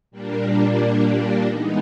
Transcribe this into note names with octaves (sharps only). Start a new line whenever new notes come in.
A#2 G3 A#3 D4
E3 G#3 B3 D#4